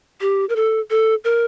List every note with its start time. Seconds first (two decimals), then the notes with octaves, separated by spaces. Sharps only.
0.21 G4
0.49 A#4
0.56 A4
0.91 A4
1.25 A#4